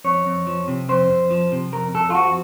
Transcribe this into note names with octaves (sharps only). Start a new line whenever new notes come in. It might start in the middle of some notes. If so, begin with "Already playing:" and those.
F2 C#5
F2
F3
C3
F2 C5
F2
F3
C3
F2 A#4
F2 A4
F4
F3 F#4